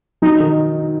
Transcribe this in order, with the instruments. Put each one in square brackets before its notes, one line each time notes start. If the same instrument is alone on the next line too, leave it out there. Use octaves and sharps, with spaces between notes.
[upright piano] F#3 [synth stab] D#4
[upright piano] D#3